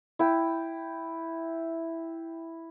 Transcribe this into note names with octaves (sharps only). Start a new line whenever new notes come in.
E4 G5